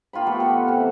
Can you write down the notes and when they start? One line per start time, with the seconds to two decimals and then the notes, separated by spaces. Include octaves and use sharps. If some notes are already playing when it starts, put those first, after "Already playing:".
0.13 A#3 F4 G5 B5
0.27 A3 B3 G4 A4
0.40 A4 F#5
0.67 C3 E3 B4